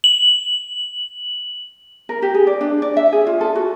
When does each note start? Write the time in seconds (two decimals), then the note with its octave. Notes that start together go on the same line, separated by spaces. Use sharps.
0.04 F#7
2.09 A#4
2.22 G4
2.34 G#4
2.47 D5
2.61 D4
2.82 D5
2.97 E5
3.12 G#4
3.27 F4
3.41 A4
3.56 F#4